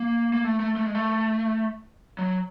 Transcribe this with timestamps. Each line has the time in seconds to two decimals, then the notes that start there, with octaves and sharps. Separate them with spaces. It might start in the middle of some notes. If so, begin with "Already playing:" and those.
Already playing: A#3
0.34 A#3
0.44 A3
0.60 A3
0.76 A3
0.86 G#3
0.95 A3
2.19 F#3